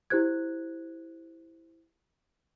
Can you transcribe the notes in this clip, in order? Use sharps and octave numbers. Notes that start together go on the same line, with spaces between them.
E4 G4 C5 F#6 G#6